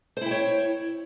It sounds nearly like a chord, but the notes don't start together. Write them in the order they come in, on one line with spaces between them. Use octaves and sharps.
C5 E4 G5 C#5